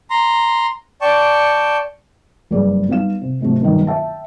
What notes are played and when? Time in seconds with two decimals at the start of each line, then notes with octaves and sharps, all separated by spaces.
0.11 A#5 C6
1.01 D5 G5 A5 C#6
2.51 F#1 G2 G#4 D5
2.89 G3 B3 D#4 F5 E7
3.21 C3
3.41 G#2 C3 F#3 A3
3.60 F#1 G2 B2 D#3
3.87 E5 G5 A5